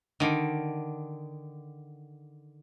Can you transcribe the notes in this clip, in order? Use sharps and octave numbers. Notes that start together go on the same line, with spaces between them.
D3 D#3